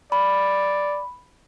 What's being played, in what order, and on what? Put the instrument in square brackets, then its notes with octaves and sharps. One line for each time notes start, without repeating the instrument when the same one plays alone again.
[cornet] D5 [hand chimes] B5